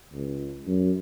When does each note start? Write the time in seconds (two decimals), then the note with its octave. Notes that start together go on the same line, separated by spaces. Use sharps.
0.12 C#2
0.67 F#2